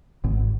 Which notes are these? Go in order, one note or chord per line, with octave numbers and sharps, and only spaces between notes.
G#1